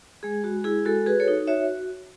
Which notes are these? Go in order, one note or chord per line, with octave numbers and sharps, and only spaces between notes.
G#3 G#4
G#3 F#4
E4 G#4
G#3 F#4 A4
F#4 G#4 B4
A4 C#5
D#4
F#4 C#5 E5